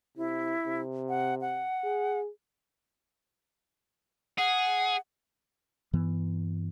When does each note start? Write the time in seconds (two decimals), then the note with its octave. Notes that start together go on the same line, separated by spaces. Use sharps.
0.17 C3 E4
0.66 C3
1.09 F#5
1.41 F#5
1.84 G#4
4.38 G#4 F#5
5.93 G2 E3 B3